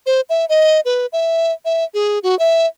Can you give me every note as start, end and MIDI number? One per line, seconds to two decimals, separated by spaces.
0.06 0.21 72
0.30 0.45 76
0.49 0.80 75
0.85 1.06 71
1.13 1.52 76
1.65 1.84 76
1.94 2.19 68
2.23 2.38 66
2.39 2.66 76